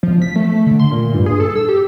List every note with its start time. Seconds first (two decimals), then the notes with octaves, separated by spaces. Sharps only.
0.03 F3
0.22 B6
0.36 A3
0.66 D3
0.80 C6
0.91 A#2
1.14 G2
1.26 G#4
1.40 A4
1.56 E6
1.69 G4